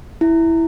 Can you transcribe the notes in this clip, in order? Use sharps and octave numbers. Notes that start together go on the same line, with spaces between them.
E4